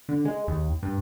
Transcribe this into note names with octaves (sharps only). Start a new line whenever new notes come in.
D3
G#3
D#2
G2